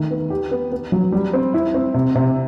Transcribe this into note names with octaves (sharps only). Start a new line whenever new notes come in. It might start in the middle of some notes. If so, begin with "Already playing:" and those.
Already playing: D#3 A3
B3
G4
B3
B3
F#3
G3
C4
E4
C4
C3
C3